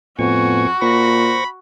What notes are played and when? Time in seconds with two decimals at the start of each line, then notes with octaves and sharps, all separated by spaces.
0.19 F2 A2 B3 F#4 G#5 C#6
0.82 A#2 C5 B5 C#6 A#6